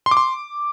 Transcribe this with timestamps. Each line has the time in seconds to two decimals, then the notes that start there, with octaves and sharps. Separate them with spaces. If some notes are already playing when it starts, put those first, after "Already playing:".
0.06 C6
0.11 D6
0.17 C6